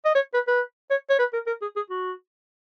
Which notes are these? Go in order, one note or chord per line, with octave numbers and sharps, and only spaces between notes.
D#5
C#5
B4
B4
C#5
C#5
B4
A#4
A#4
G#4
G#4
F#4